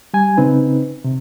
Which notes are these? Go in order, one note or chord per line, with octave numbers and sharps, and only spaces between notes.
G3 G#5
C#3 C4 D#4 B4
C3